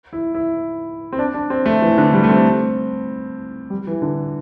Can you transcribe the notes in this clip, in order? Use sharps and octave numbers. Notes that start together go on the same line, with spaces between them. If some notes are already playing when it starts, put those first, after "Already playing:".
E4
E4
C4
D4
D4
C4
A3
E3
D3
G3
A3
C4
G3
E3
D3